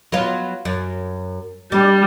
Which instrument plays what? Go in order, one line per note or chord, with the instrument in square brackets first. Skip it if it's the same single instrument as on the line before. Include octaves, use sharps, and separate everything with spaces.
[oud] F#3 B3 F4
F#2
[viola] G3 [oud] D4